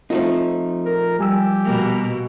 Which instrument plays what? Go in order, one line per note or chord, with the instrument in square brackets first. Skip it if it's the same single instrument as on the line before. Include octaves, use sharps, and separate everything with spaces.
[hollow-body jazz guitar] F3 A3 D#4 [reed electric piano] C4 F4
[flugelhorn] A#4
[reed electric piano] G3 G#5 E6 [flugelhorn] G4
[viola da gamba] B2 A#3